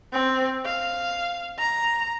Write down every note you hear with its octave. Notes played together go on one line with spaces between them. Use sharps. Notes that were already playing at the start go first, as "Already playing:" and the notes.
C4
F5
A#5